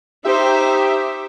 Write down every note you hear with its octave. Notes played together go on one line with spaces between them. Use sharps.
D#4 G4 C5 E5